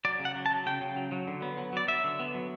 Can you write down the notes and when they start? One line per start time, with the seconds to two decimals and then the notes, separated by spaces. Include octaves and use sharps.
0.05 F#3 D5
0.19 C#3
0.25 F#5
0.35 F#3
0.46 A5
0.51 F#3
0.66 C#3 G5
0.81 C#3
0.96 F#3
1.12 F#3
1.27 D3
1.42 B3
1.57 F#3
1.73 F#3 D5
1.88 F#3 E5
2.04 D3
2.20 B3
2.35 F#3